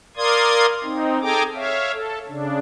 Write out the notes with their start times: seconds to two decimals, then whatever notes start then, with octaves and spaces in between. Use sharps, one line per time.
0.17 A#4 D5 F5 C6 D#6 G#6
0.83 C4 D#4
1.21 G#4 A4 G5 G#5 A#5 D6
1.55 C#5 E5 F5
1.92 A4
2.29 C#3 D4